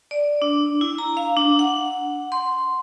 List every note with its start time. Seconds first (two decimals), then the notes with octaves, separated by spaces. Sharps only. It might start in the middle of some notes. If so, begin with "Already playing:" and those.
0.11 D5
0.42 D4
0.81 E4
0.98 A#5
1.17 F5
1.37 D4
1.59 F#5
2.32 C6